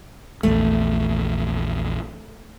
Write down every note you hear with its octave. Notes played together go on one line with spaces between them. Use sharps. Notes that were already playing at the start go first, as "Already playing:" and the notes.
A#1 E2 A3